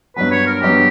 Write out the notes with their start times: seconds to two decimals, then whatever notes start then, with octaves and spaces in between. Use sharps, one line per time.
0.16 G2 F#3 B3 B4
0.31 C#5
0.46 A#4
0.62 G2 F#3 B3 G4